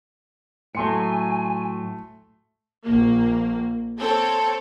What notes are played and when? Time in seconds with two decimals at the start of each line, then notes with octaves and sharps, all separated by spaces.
0.75 A2 F#3 A3 G#5 C6 C#7
2.85 A#1 A#3
3.98 C4 A4 C#5